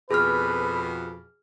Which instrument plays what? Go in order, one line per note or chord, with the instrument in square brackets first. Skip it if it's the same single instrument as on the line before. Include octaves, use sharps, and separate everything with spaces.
[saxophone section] F2 B2 [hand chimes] G#4 F6 [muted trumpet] B4